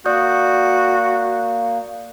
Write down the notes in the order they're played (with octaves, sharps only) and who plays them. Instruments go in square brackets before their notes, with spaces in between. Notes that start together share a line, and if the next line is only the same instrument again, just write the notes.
[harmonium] A#3 [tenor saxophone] F#4 [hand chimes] D5 D#6 G6